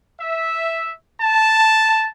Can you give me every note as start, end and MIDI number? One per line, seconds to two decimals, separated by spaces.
0.20 0.93 76
1.21 2.09 81